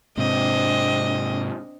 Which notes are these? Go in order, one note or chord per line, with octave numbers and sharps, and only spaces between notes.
G#2 C3 C4 D4 D#5